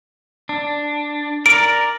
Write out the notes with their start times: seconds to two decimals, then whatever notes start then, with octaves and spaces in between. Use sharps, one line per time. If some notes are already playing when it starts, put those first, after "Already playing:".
0.49 D4
1.46 A#4 D5 D7